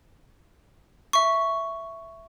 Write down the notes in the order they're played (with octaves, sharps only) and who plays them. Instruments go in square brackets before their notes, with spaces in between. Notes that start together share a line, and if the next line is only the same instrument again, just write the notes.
[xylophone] E5 C#6